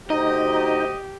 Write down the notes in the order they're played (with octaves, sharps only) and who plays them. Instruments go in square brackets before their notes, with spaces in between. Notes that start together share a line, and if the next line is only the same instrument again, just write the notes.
[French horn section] D2 F#4 C5 [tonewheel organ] D#4 [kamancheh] G4 [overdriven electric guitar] D#5